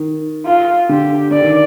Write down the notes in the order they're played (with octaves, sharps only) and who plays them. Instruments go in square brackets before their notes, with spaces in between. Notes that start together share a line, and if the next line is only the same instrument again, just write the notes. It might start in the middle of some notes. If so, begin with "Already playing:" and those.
Already playing: [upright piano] D#3
[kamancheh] F4
[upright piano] D3 [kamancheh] G4
[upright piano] D3 [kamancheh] D5
[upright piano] D#3